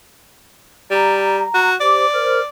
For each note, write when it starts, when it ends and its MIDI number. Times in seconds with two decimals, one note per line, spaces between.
0.91 1.43 55
0.91 1.71 82
1.54 1.75 66
1.80 2.05 67
1.80 2.05 72
1.80 2.48 74
1.80 2.05 86
2.13 2.39 70
2.13 2.39 72
2.13 2.39 89